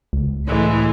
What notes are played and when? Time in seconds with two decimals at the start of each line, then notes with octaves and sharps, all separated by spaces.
0.13 C#2
0.47 A2 E3 G#3